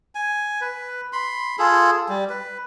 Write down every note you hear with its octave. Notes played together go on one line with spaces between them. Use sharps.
G#5
B4
B5 C6
F4 G#4 A4
G3
B4